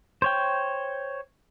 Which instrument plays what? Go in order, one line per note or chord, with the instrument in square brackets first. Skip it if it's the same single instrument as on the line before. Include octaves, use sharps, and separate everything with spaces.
[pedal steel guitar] C5 C#5 G5